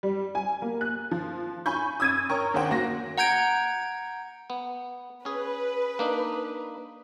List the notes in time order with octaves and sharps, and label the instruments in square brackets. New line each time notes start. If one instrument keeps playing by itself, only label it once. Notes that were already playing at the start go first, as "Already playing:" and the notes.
[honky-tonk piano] G3
G#5
A#3
F#6
F3
G#5 B5 C#6 G6
D#6 E6 G#6 A6 D#7
A#4 C#5 G5 A#5 C#6
D#2 D#3 C5 F#5 G5
F#1 A#3 F#4 A#6
[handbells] F#5 A#5 G6 G#6 D7
[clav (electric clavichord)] B3
[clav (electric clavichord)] C#4 G#4 [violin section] B4
[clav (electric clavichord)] A#3 D4 D#4